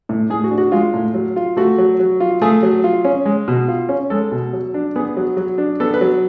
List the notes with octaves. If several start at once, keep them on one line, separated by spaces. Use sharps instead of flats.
A2
A2 G#4
F#4
D4
F#4
G#3 F4
A2
F#3
F4
A3 F#4
F#3
F#3
F4
A3 G#4
F#3
F4
C#4
G#3
B2
F4
C#4
G#3 A4
B2
F#3
D4
B3 G#4
F#3
F#3
D4
B3 A4
B4
F#3